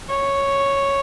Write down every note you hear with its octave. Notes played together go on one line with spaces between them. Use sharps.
C#5